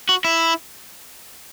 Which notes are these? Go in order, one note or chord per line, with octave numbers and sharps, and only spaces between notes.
F#4
E4